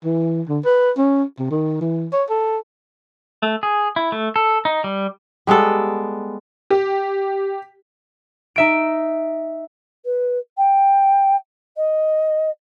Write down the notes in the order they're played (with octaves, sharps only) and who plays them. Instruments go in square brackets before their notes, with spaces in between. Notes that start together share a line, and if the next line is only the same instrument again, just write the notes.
[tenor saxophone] E3
D3
B4
C#4
C3
D#3
E3
C#5
A4
[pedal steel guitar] A3
G#4
E4
A3
A4
D#4
G3
[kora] G3 G#3 B3 A4
[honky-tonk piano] G4
[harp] D#4 E5 D7
[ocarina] B4
G5
D#5